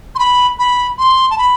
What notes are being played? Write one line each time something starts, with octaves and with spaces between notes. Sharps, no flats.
C6
B5
B5
C6
A5
B5